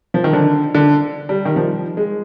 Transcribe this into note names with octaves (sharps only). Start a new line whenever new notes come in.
F3
D#3
D3
D3
G3
D#3
F3
G#3